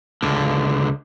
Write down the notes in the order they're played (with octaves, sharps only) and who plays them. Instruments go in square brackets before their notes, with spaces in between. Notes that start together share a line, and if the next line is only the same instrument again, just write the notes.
[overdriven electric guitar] C#2 D3